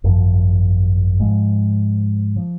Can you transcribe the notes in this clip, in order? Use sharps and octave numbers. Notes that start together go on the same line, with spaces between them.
G#1 F#2 F3
G#2 F3 G#3
F3